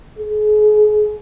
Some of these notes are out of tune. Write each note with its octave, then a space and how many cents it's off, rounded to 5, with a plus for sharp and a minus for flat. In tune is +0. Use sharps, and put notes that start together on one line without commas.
G#4 +35